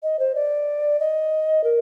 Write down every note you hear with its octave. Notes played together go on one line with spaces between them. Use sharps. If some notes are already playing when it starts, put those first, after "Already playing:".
D#5
C5
D5
D#5
A#4